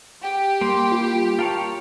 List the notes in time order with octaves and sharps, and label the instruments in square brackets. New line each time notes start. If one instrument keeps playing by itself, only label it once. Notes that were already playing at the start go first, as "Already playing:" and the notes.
[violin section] G4 [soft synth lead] G5
[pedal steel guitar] G3 A#3 [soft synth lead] C6
[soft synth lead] F4
[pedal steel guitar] F4 A#4 C#5 [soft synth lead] A5